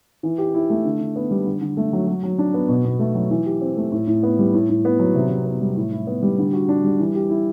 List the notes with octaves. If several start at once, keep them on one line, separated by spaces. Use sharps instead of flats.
E3
G4
E4
A3
D3
D3
B3
G3
D3
D3
A3
F#3
F#3
F#3
D4
B3
B2
B2
A3
F#3
E3
G4
C4
A3
A2
A2
B3
G3
A2
A2
B3
F#3
C3
C3
B3
G3
A2
E4
B3
G3
D3
F#4
D4
G3
E3
G4
E4